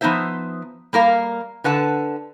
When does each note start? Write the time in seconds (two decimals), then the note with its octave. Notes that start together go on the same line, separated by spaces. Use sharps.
0.01 F3 B3 C4 D#4 C5 E5
0.93 G3 A#3 A#4 F5
1.64 D3 B4 F#5 A5